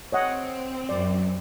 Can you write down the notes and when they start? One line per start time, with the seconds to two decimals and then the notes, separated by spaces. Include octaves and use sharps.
0.12 C4 C#5 D#5 F#5
0.89 F#2 D5